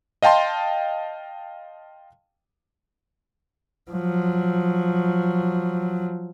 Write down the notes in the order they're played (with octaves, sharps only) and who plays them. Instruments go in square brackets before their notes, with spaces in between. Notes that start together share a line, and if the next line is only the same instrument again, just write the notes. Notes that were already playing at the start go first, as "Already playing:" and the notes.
[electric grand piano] D#5 F5 G5 A5 C6
[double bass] F3 F#3